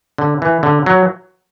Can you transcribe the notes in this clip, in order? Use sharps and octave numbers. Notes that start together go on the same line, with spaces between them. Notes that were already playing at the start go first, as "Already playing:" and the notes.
D3
E3
D3
F#3